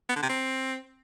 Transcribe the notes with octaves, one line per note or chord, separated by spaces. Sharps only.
B3
D3
C3
C4